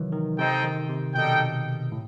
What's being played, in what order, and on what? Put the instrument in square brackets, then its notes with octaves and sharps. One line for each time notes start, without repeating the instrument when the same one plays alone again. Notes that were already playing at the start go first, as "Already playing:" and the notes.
Already playing: [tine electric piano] C3 D#3 E3 F#3
D#3
[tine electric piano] C3 [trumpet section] C4 D#4 A4 D#5 G5
[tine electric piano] D#3
C3
[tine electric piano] B2 [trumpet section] G3 D#4 A4 D#5 G5
[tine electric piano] A2